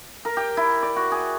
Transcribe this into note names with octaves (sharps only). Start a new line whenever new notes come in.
A#4
G4
E4
D5
F#4
G#4